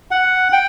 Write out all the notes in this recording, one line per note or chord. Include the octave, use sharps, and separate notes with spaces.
F#5
G5